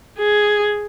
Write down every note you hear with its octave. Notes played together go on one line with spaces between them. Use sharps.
G#4